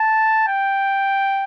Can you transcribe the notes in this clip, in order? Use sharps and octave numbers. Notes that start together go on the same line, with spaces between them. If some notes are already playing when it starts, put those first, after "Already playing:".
Already playing: A5
G5